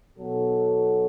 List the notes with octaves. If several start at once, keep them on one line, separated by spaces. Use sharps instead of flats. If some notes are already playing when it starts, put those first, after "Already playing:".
B1 B2 F#3 F#4 A4